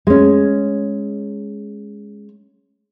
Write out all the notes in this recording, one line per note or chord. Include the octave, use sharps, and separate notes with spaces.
G#3 C#4